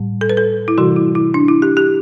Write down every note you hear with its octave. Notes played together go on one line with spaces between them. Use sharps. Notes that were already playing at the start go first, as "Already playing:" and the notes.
Already playing: A2 G3
A4
B4
A4
E4
C3 E3 G3 F#4
E4
E4
D4
E4
G4
G4